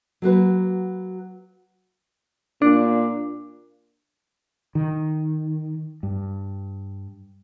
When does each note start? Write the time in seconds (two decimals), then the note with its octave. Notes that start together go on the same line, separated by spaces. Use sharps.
0.22 F#3 A#3 F#4 B4
2.62 A#2 D4
4.75 D#3
6.03 G2